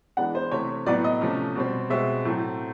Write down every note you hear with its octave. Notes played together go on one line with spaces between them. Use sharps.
E3 G#3 B3 D4 F#5
C5
C3 E3 A3 C4 C#5
A2 F#3 B3 D5
D#5
C3 F3 A3 C#4
B2 G3 C4
B2 G#3 C4 E5
A2 F#3 A3 C4